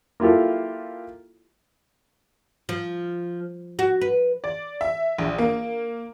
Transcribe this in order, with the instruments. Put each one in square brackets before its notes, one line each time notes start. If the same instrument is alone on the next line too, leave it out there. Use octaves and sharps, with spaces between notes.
[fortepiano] A#3 E4 F4 G4 A4
[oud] F3
F#4
B4
[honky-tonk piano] D5
E5
A#1
A#3